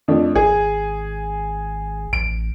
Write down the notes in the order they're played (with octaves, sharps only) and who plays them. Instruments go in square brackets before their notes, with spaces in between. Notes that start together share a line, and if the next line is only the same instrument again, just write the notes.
[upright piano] F2 A3 D4
[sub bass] G#1 [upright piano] G#4
[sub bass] A1 [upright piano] D7